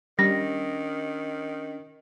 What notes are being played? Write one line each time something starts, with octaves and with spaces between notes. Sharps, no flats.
D#3 G3 C#4 D4 A#6